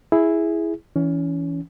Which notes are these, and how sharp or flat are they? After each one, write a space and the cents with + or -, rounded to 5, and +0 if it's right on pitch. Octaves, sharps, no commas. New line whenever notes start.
E4 +0 G#4 +0
E3 +0 C#4 +25